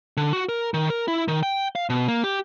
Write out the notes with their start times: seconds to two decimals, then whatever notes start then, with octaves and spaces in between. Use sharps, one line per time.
0.17 D3
0.33 F#4
0.49 A#4
0.74 D#3
0.90 A#4
1.08 E4
1.28 D#3
1.43 G5
1.76 F5
1.90 B2
2.08 A#3
2.24 G4